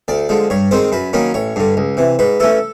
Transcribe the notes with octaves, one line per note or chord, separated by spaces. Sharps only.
D2 D5
D3 F3 G#3
G2 C#5
D#3 G#3 C4 C5
F#2 B4
D#3 F#3 A#3 C#4
A1 C#5
G2 D3
C#2
C3 E3
G#2 B4
E3 A3 C#4 A4